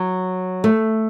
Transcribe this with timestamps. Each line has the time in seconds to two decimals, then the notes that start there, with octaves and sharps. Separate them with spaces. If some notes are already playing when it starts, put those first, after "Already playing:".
Already playing: F#3
0.64 A3